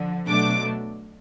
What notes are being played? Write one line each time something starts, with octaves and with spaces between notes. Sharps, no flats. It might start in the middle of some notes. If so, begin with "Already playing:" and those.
Already playing: D3 F3
B2 F#3 A3 D4 D6